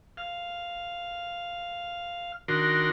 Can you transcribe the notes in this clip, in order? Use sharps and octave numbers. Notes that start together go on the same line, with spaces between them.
F5
D#3 D4 F#4 A#4 C6